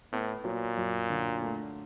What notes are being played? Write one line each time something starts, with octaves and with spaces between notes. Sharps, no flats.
A2 B3
A#2 F#3
F#2
D3
A3